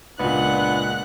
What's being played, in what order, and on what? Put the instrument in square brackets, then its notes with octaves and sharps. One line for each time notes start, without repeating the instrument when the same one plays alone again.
[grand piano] C#2 A#2 [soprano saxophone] B3 [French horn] D4 [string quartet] F#5 F#6